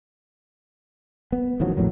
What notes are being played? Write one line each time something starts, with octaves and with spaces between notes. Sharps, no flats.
B3
A1 D#3 F3 F#3
A#1 F2 A2 F#3